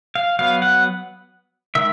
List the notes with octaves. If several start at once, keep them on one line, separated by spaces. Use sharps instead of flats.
F5
F#3 B3 F5
F#5
D#3 G#3 E5